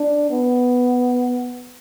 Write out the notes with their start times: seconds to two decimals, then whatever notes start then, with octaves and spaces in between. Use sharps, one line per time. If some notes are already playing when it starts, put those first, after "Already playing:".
Already playing: D4
0.30 B3